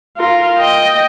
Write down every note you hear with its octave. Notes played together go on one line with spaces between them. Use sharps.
F4 A#4
D#5 G5